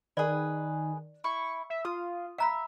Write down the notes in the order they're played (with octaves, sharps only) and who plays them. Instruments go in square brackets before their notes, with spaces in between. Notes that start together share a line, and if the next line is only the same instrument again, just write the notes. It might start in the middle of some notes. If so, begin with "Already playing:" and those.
[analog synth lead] D#3 [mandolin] G#4 B4 [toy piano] D5
[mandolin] E4 [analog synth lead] C#6
[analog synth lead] E5
[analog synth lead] F4 [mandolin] D#6
[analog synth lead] E5 [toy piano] F5 A#5 B5